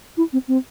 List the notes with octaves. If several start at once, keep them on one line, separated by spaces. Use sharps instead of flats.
E4
C4
C4